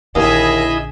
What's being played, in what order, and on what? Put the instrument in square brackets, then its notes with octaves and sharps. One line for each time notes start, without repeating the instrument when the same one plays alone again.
[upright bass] A#1 D3 [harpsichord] D#2 [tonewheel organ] E4 D#5 [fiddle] G#4 E5